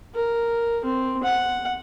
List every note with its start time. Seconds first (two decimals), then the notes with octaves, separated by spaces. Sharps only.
0.15 A#4
0.85 C4
1.24 F#5